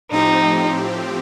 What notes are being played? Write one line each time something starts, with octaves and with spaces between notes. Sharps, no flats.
A2 F3 C4 D#4 G4